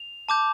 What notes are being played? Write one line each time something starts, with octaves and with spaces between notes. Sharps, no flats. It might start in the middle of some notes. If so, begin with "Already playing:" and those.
Already playing: F7
A5 D6 G6